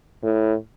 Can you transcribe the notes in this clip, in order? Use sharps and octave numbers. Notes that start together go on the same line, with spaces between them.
A2